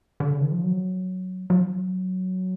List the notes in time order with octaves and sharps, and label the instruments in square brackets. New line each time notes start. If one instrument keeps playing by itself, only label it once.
[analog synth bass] D3
C#3
D#3
F3
F#3
F#3